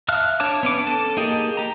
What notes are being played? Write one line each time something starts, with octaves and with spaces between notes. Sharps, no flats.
E5 F5 A5 F6 F#6
D4 C#5 A5 D6
B3 C#4 D6
A4 A5
A#3 D#4 G4 G#4
G4 A#5